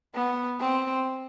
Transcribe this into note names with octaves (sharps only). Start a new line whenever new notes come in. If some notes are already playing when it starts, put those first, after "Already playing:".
B3
C4